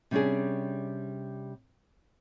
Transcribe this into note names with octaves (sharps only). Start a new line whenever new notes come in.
C3 G3 C#4 D4 G#4